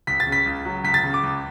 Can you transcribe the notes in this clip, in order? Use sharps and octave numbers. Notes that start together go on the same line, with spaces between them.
C#2 B6
A6
C#3
B6
C#2
F#3
C#2 B6
A6
C#3
D6
C#2